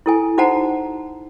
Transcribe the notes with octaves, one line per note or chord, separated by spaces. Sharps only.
E4 A4 G#5
D#4 F#4 C5 F#5 A5 A#5